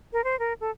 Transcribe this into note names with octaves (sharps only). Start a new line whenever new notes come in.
A#4
C5
A#4
A4